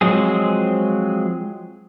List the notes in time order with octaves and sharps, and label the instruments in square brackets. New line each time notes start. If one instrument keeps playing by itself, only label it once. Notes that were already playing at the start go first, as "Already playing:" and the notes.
[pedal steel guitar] F3 F#3 G#3 C4 G#4